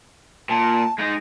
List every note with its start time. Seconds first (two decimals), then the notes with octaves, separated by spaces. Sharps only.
0.49 A#2 A5
0.98 G#3 D#4